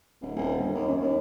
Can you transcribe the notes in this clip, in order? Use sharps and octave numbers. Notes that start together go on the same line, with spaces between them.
D1
D#1
G1
D#2
F#2
D#2